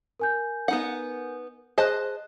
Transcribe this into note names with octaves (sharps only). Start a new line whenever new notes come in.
A#4 G#5 G6
B3 D#4 F#5
G#4 C5 D#5 A5 F#6